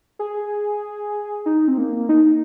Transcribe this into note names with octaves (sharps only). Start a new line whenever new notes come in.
G#4
D#4
C4
A#3
D#4